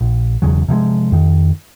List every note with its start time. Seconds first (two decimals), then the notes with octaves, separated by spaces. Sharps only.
0.01 A#1
0.42 E1 E2 C#3 F#3
0.68 C3 F3 F#3 G#3
1.12 F2 D#3